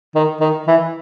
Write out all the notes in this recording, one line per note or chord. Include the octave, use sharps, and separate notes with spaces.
D#3
D#3
E3